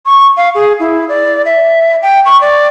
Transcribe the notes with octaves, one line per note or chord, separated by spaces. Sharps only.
C#6
F5
G#4
E4
D5
E5
G5
C#6
D5